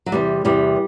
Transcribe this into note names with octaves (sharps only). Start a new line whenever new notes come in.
F#3
E2 C3 E3 G3
E2 C3 E3 G3